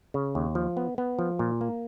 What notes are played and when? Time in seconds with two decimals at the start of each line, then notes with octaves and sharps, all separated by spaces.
0.14 C#3
0.35 D#2
0.55 F3
0.77 B3
0.98 B3
1.19 F3
1.39 A#2
1.61 A#3